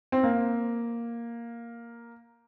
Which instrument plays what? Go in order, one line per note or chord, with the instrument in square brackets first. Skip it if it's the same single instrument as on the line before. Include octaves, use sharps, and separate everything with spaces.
[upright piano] C4
A#3